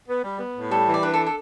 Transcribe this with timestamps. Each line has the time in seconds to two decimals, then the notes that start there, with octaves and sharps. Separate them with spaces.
0.08 B3
0.24 G3
0.39 B3
0.56 A2
0.71 G3 A4
0.87 E3
0.94 D5
1.03 D4 B4
1.14 A4
1.26 A4